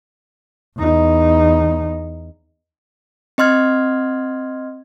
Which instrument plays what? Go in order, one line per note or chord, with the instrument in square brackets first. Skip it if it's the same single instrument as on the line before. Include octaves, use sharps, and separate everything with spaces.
[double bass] E2 D#4
[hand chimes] C4 D#5 C6 F6 G#6